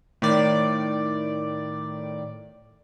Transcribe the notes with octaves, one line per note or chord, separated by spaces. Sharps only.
A2 D#3 D5